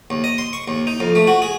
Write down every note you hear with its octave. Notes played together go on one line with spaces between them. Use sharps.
D#2
D#5
C6
C#6
D#2
D#4
F2
A3
F#4
G#4